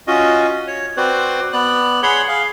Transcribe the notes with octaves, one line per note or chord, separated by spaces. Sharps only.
C#4 F4 F#4 D#5
C#5
C4 F#4 B4 C5 D5
B3 D5 F#6
G#4 C#5 F#5 B5 C6
G#4 F5